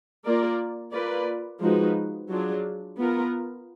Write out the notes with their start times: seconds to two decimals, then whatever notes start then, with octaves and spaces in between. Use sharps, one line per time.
0.24 A#3 F4 A#4 D5
0.92 A#3 F4 B4 D5
1.61 F3 G#3 D#4 F#4 B4
2.29 F#3 D4 F4 G#4
2.98 B3 F4 A#4